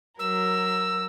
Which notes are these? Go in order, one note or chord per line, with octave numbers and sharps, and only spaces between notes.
F#3 A#4 E6